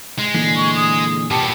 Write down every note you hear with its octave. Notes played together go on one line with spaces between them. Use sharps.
G#3
A#2 D3 E3
C#6
D#6
A#2 B3 G4 A5